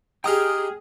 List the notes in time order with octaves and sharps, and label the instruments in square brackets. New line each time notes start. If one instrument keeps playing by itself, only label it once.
[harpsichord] D#4 G4 [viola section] G#4 [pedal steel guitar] G5 D#6 F6